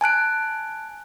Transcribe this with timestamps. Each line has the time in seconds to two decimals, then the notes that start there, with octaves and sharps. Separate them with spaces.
0.01 G#5 A5 F#6 D7